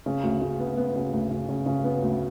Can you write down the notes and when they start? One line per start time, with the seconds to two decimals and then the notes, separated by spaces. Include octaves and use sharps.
0.06 C#3
0.23 D2
0.41 C#3
0.59 B3
0.77 B3
0.96 C#3
1.13 D2
1.30 C#3
1.49 C#3
1.66 C#3
1.84 B3
2.02 D2